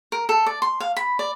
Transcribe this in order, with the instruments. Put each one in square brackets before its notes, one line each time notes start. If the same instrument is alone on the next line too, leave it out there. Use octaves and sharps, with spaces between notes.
[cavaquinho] A#4
A4
D5
C6
F5
B5
D5